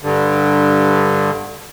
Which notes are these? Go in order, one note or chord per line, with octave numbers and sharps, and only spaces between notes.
G2 D3